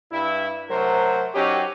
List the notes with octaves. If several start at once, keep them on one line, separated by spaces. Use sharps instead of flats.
G2 E4
C3 F#3 A3 A#4 C5
F#3 C#4 D#4 G4